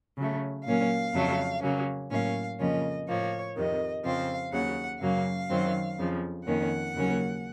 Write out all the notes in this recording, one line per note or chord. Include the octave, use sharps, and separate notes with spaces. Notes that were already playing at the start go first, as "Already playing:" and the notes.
C#3 F#3 A3
A#2 F#3 A#3 C#4 F5
F2 C#3 F#3 A3
C#3 F#3 A#3 C#4
A2 F#3 A#3 C#4 F5
F2 C#3 F3 A#3 C#4 D#5
A2 F3 A#3 C#5
F2 C3 D#3 D#5
F2 C#3 F3 C4 F5
D#2 C#3 F#3 F#5
F#2 C#3 F#3 A#3 F5
F#2 D#3 F#3 C4
F2 C#3 F3
F2 D#3 A#3 C#4 F#5
D#2 C#3 F#3 A#3 C#4